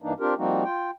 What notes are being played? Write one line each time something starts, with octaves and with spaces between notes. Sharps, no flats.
G2 E3 A#3 D4 D#4
C4 D4 F4 G4 A#4
F3 G3 A#3 C4 D#4 F#4
F4 G5